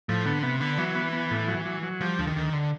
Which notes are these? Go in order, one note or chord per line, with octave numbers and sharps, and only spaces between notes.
A2 F3
D3 B3
C3 B3
D3 B3
E3 F#3
B3
B3
A2
F#3
F#3
F#3
F3 G3
D2
D#3
D2
D3